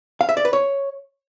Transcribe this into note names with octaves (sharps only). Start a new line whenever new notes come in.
F5
E5
D5
B4
C#5